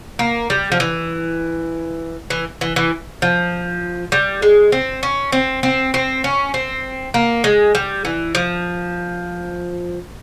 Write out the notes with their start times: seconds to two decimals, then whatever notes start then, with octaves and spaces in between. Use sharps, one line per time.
0.19 A#3
0.50 G3
0.72 F3
0.80 E3
2.30 E3
2.61 E3
2.76 E3
3.22 F3
4.12 G3
4.42 G#3
4.72 C4
5.03 C#4
5.32 C4
5.63 C4
5.94 C4
6.24 C#4
6.54 C4
7.14 A#3
7.44 G#3
7.75 G3
8.05 E3
8.35 F3